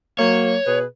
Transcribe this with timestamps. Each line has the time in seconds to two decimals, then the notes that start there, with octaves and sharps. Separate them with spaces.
0.19 F#3 A#3 C#5
0.66 B2 G#4 B4